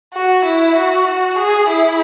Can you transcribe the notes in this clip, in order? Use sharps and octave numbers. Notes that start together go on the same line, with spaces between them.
F#4
E4
F#4
F#4
G#4
E4